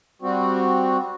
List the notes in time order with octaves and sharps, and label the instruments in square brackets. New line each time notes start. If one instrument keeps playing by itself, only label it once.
[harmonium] G3 C4 F#4